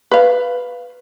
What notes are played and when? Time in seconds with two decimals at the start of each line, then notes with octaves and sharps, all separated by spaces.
0.11 B4 F5